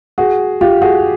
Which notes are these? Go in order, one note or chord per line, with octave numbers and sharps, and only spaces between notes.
F#4 G#4
F4 G4
F#4 G#4